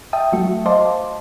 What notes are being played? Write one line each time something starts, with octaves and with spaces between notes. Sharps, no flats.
E5 G5 A5 D#6
F#3 A3 F#4
C5 D#5 F5 A5 C6 D6